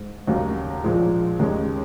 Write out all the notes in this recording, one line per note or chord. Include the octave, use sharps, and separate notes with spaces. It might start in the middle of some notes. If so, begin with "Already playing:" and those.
Already playing: G#2
D#2 C#3 F#3 A#3 C#4
A#1 A#2 F3 G#3
D#2 D#3 G#3 C#4